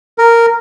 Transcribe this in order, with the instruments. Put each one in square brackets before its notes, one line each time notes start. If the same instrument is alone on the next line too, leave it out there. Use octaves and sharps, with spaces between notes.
[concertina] A#4